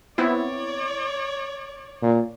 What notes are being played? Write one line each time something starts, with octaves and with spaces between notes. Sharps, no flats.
B3 C4 E4 C#5 D5
A#2